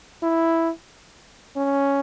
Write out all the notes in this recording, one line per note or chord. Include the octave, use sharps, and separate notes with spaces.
E4
C#4